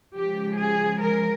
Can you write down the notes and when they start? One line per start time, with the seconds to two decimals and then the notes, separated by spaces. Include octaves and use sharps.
0.14 C#3 F3 G#3 G4
0.57 G#4
1.00 A#4